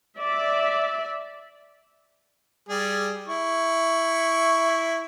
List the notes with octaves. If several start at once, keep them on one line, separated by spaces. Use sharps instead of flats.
D5 E5
G3 G#4
E4 C#6